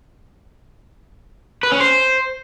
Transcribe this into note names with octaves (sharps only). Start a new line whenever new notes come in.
B4
C#4
C5